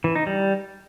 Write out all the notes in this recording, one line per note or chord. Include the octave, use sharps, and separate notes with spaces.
E3
D#4
G3